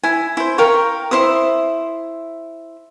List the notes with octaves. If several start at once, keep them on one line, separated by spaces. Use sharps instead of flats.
E4 G#5
E4 C5
A#4 F5 G5 C#6
E4 C5 E5 D#6